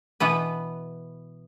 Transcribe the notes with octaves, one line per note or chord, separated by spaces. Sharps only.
B2 E3 B3 B4